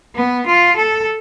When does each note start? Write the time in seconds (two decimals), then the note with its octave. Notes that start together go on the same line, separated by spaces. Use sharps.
0.15 B3
0.46 F4
0.76 A4